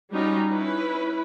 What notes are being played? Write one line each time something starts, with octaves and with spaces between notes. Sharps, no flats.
G3 C#4 D#4 F4 F#4
C#4 E4 B4